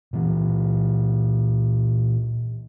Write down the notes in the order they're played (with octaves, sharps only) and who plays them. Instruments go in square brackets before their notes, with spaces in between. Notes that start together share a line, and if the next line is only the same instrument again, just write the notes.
[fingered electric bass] A#2 E3